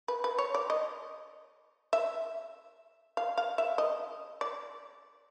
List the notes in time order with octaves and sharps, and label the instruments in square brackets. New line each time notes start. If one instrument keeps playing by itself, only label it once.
[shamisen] B4
B4
C#5
D5
D#5
E5
F5
F5
E5
D#5
D5